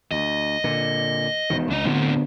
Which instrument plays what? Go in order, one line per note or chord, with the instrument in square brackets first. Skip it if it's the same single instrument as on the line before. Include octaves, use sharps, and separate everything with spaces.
[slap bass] D2 [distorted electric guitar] D#5
[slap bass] A#2 D3
E1 B2 D#3
[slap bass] C#2 [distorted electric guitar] D4 D#5
[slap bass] D2 D3 B3 [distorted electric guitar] A2 C4